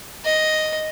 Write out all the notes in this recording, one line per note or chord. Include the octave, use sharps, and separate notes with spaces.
D#5